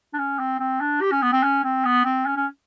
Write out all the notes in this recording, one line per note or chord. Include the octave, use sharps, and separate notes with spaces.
D4
C#4
C4
C4
D4
G4
C#4
B3
C4
C#4
C4
B3
C4
C#4
C#4